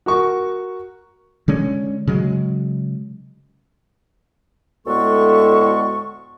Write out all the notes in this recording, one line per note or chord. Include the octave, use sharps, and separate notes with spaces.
F#4 A#4 C#6
D3 G#3 C#4
C#3 F#3 G#3
D2 A2 G#3 B3 A4 C#6